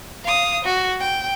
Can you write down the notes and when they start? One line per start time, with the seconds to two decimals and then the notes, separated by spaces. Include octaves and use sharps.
0.25 F5 D#6
0.64 F#4
1.00 G5